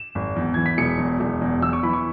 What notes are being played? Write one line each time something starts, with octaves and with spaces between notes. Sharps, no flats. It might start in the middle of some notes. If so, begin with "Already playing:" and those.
Already playing: E7
G#1
E2
E3 G#6
B6
E1 C#7
E2
E1
E2
E2 E6
C#6
E3 B5
C#6